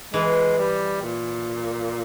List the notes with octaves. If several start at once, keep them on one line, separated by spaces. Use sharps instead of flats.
E3 G#3
G3
A#2